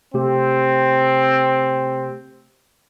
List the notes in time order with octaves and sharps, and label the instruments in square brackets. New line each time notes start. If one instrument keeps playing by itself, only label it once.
[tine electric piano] C3 A3 G4 [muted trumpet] C4